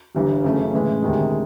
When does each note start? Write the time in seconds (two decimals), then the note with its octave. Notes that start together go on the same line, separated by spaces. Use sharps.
0.15 G1 G2 E3 G3
0.44 F#2 C#3 E3 A3
0.73 A2 E3 G#3
1.02 D2 C3 D#3 G#3